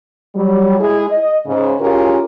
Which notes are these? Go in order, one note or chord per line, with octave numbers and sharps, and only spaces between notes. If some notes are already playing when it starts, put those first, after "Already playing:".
F#3 G3
G#3 E4 G#4
D#5
G#2 C#3
C#4 E4 F4 G4 G#4 A#4